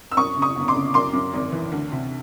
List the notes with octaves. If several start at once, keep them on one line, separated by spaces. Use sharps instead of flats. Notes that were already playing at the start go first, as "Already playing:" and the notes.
E6
F#2 C#6 D#6
C#3
C#6 D#6
G1
C6 D6
C#3
F#2 C6 D6
F#2
G#1
E3
D2
C3